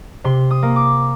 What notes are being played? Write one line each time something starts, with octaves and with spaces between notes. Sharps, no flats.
C3 C6
D#6
A#3
D6